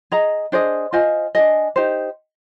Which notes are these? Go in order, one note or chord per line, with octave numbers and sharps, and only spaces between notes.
G#4 D#5 A#5
D4 G#4 C5 D#5
F4 C5 D#5 G#5
D4 G#4 D#5 G#5
D#4 G4 C5